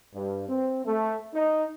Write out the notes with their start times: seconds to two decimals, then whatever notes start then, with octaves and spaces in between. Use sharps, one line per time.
0.15 G2
0.49 C4
0.86 A3
1.35 D#4